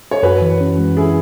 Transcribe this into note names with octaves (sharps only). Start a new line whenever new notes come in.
C#5
F#2 F#4 B4
E3
C#4
G#3
E4 G#4